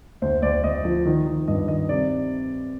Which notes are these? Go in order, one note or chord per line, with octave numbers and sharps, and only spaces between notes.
D2 C5
D2 D5
D2 D#5
F3
D#3
D#3
G2 D#5
D#3 D#5
C3 D5